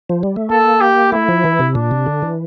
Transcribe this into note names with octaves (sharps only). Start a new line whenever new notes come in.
F3
G3
A3
A#3 A4
G4
A3 E4
F3
E3
C3
A#2 D4
C3
D3
E3